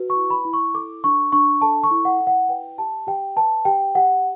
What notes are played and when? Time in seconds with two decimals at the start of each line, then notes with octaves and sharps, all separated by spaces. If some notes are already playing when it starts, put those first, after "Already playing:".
Already playing: F#4 B4
0.10 C#6
0.16 E4
0.30 B5
0.45 E4
0.53 C#6
0.74 A4 D6
1.04 D4 C#6
1.32 D4 C#6
1.61 A4 A5
1.84 C#6
1.91 E4
2.05 F#5
2.20 E4
2.27 F#5
2.49 B4 G5
2.78 G4 A5
3.07 G4 G5
3.36 B4 A5
3.65 G4 G5
3.95 G4 F#5